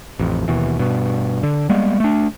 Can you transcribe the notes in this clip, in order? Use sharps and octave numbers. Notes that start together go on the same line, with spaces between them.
A1 F2
D#2 B2 E3
G2 B2
D3
G3 G#3 A#3 B3
A3 D4